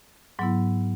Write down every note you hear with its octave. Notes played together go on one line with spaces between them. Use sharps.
G#2 F#3 B3 E4